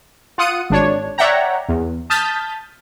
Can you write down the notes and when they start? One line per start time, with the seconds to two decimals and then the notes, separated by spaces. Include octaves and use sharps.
0.38 F4 F#5 D#6 C#7 D#7
0.70 G#1 D4 C#5
1.18 C#5 D5 E5 F#5 G5 A#5
1.69 E2
2.10 A5 D#6 F6 G6 A6 B6